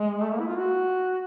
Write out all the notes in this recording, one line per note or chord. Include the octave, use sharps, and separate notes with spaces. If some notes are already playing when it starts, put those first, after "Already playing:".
Already playing: G#3
A3
A#3
E4
F4
F#4